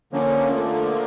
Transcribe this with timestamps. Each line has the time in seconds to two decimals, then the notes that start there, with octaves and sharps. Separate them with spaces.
0.13 D3 F3 A#3 C#4
0.52 A3